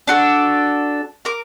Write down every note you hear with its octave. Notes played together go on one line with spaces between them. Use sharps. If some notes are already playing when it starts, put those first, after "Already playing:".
D4 F#4 A4
A#4 D6